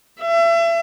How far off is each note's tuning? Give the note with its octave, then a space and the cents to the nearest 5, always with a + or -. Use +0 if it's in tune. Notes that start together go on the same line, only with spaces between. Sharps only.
E5 +35